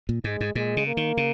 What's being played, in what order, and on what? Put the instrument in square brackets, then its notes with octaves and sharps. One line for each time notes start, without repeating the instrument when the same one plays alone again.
[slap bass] A#2
[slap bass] G#2 [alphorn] G#3
[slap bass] G#2
[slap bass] A#2 [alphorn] G#3
[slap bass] C#3
[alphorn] A#3
[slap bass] D#3
C#3